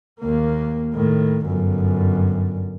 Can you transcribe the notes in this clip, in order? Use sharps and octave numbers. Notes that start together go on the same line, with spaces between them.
D#2 A#3
A2 D#3
G1 F#2